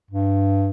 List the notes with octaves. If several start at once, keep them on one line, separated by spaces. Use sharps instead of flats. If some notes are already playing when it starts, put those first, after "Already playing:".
G2